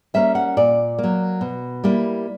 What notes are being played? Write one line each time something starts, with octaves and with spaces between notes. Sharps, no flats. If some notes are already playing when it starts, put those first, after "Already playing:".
G3 A#3 C#4 E5
F#5
A#2 D5
F#3 A#3
B2
G3 A#3 E4